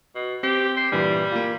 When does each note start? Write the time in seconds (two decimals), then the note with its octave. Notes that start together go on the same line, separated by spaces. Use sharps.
0.15 B2
0.43 C4 G4 C7
0.77 C5
0.92 G2 A#2 E3 G3
1.32 A#3 F4